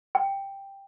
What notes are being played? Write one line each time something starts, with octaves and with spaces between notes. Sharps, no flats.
G5